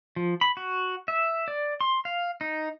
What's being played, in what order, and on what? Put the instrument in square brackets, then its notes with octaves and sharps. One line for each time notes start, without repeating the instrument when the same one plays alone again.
[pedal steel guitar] F3
B5
F#4
E5
D5
C6
F5
D#4